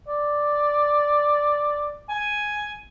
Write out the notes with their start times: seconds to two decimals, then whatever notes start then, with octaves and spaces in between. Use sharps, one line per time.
0.08 D5
2.09 G#5